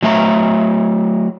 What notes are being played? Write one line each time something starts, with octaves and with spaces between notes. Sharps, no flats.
F#3 A3 E5 F#5 A#5